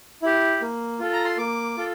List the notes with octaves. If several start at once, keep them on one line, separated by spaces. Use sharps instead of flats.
E4 G4
A#3
F4 A4
A#5
C6
A#3 D6
F4 A4